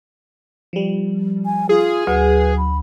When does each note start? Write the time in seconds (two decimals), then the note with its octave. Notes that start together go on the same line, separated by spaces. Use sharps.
0.73 F3 G3
1.45 G#5
1.69 F4 G#4
2.07 D2 F#3 B4
2.57 B5